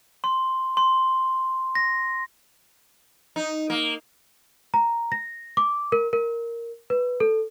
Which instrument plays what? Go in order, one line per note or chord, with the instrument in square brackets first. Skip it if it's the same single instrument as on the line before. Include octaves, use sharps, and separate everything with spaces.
[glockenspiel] C6
C6
A#6
[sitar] D#4
A#3
[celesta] A#5
A#6
D6
A#4
A#4
B4
A4